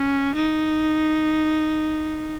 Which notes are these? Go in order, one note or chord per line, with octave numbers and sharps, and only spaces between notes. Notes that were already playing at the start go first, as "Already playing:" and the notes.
Already playing: C#4
D#4